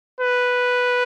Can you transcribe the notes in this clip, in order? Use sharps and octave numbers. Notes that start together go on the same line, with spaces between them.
B4